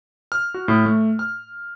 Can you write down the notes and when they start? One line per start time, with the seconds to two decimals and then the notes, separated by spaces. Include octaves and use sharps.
0.32 F6
0.54 F#4
0.68 A2
0.86 A3
1.19 F6